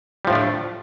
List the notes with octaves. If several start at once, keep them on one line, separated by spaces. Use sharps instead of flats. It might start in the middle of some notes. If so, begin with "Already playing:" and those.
A2 F3 G3 A3 D4